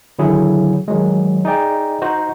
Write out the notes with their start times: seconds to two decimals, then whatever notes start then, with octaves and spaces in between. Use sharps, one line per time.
0.19 D3 D#3 F#3 E4 G#4
0.88 D#3 F#3 G#3
1.45 D#4 G#4 D5 G5
2.02 D#4 F#4 C5